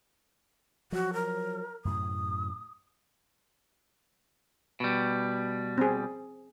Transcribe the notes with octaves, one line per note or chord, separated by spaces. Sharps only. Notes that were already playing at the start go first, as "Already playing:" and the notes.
F3 F#3 F#4
A#4
F#2 A2 C3 D#6
B2 G3
C4 G#4